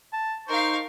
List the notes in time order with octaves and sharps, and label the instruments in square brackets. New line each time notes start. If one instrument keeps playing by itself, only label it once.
[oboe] A5
[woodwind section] D#4 [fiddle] A#4 F5 [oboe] C5 [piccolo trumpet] C#6